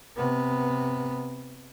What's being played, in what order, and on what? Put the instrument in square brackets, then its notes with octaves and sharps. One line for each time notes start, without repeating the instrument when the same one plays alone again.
[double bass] C3 B3